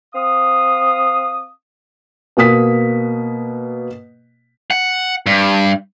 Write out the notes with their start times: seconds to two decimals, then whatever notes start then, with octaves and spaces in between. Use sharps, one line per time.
0.15 C4 F5 D#6
2.37 B2 A#3 D#6 B6
4.71 F#5
5.26 G2